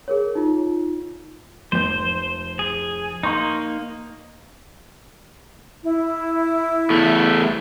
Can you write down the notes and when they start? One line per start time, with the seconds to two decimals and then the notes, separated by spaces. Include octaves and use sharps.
0.08 G#4 A#4 C#5
0.35 D#4 F4
1.72 F1 C5 G6
2.59 G#4
3.23 A#3 D#4 C6 C#6 G6
5.84 E4
6.90 E2 A3